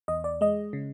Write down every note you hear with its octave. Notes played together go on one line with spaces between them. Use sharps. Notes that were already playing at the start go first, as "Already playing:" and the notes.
E2 D#5
D5
G#3 D#5
C#3